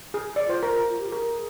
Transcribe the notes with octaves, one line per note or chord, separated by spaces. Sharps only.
G#4
D5
F4 C5
F4 A#4
F4
G4
G#4 A#4